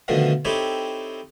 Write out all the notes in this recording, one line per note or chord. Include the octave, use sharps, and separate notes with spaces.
B2 D3 D#3 F3 A3
C4 D#4 E4 G4 A4 C#5